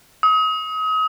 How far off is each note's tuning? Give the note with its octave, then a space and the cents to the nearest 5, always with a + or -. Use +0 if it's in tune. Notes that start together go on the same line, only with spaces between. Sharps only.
D#6 +35